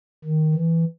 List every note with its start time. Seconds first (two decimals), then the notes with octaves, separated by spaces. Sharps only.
0.25 D#3
0.54 E3